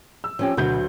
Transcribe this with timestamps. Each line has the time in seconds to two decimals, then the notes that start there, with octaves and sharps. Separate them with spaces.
0.24 E6
0.39 F3 C#4 G4
0.57 D2 B2 F#3 F#4 B4 G6